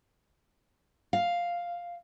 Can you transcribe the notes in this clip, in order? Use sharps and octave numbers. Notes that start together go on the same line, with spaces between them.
F5